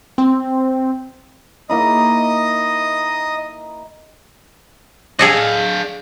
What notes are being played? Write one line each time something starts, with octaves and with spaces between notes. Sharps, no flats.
C4
A#3 D#4 E4 D#5 D#6
D4 G#4 A4 D#5 F5